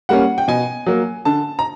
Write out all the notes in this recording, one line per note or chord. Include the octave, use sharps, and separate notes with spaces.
G3 A#3 C#4 F#5
G5
B2 G#5
F#3 A#3
D3 A5
A#5